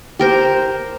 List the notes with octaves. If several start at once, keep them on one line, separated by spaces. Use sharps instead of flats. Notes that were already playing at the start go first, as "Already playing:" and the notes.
G4 A#4 C5